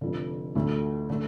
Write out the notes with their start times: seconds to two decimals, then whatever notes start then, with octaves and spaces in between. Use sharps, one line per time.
0.01 F1 F2 D3
0.55 D2 D3 A3
1.10 D3 A3